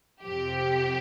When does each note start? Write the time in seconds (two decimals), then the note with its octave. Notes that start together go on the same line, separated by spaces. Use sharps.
0.22 F2 C3 F3 G4